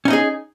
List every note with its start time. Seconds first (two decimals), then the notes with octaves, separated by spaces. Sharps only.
0.05 C#4
0.08 D#4
0.10 D#5
0.13 G#4